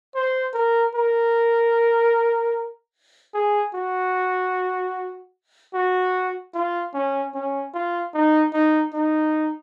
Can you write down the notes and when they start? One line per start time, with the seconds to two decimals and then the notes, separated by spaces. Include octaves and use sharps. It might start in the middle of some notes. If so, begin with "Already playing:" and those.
0.15 C5
0.54 A#4
0.95 A#4
3.34 G#4
3.75 F#4
5.74 F#4
6.54 F4
6.94 C#4
7.35 C#4
7.74 F4
8.14 D#4
8.53 D#4
8.94 D#4